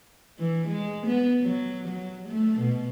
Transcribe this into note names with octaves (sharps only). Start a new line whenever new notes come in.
E3
G#3
B3
F#3
F#3
A3
B2